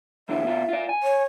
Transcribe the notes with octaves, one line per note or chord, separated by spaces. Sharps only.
F#2 D3 E3 E5
B2 F4
F4 D5
G#5
C#5